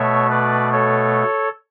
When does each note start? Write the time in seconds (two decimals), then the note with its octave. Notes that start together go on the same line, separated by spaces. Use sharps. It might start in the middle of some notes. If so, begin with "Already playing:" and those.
Already playing: B2 A3 C#5 E5
0.31 B4 D5
0.73 A4 C#5